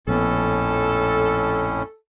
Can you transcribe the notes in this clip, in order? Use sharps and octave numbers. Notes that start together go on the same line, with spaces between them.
A#1 F2 A2 B3 C#4 A4